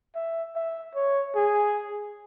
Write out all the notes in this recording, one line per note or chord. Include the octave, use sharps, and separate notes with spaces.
E5
E5
C#5
G#4